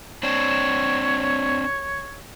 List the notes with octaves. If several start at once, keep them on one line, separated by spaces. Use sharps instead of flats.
C4 D4 C#5